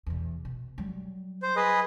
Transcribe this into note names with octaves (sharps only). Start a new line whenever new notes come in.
E2 B2
B2
F#3 G3
C5
G#4 B4 D#5